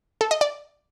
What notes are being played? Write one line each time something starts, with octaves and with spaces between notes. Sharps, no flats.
A4
D#5
D5